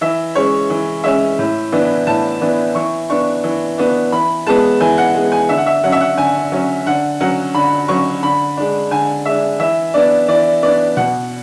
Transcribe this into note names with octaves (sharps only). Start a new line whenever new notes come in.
E3 E5
G#3 C#4 C#5
E3
G#3 C#4 E5
A2
E3 B3 D4
A2 A5
E3 B3 D4
E3 C#6
B3 D4 C#6
E3
B3 D4
E3 B5
G#3 B3 A5
E3 G#5
F#5
G#3 B3
G#5
D3 E5
F#5
E5
F#3 C#4 F#5
E5
F#5
D3 G#5
F#3 C#4
D3 F#5
F#3 C#4 F#5
D3 B5
F#3 C#4 C#6
D3 B5
G#3 D4
D3 G#5
G#3 D4 E5
E3 E5
B3 D4 D5
E3 D5
B3 D4 D5
B2 F#5